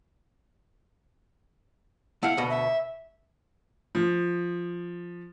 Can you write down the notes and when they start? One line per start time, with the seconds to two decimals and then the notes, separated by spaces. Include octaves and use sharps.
2.23 A3 E4 F5 F#5
2.37 D2 B2
2.50 E5
3.95 F3